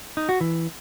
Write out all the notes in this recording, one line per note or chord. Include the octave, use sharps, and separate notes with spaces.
D#4
F#4
E3